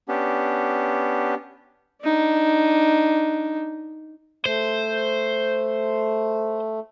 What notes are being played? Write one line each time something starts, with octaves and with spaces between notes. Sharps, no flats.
B3 C#4 D4 G4
D4 D#4
A3 C5